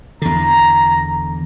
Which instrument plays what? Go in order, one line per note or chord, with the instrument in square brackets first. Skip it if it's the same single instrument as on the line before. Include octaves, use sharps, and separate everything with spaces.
[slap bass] E2 D3 [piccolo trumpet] A#5